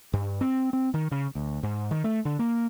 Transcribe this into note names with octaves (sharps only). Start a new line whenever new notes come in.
G2
C4
C4
D#3
C#3
D2
G#2
D#3
A3
D3
A#3